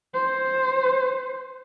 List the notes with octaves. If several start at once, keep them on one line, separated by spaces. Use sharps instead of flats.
C5